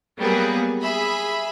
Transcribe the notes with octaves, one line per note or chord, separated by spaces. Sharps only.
F#3 G3 A#3 B3 G#4
G#4 E5 B5